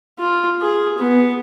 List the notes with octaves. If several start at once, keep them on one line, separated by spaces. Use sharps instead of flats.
F4
G#4
B3